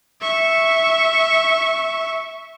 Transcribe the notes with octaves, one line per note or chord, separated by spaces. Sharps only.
E5 C#6